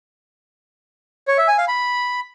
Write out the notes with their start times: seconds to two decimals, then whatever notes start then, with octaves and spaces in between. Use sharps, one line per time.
1.28 C#5
1.38 E5
1.48 G#5
1.58 F5
1.68 B5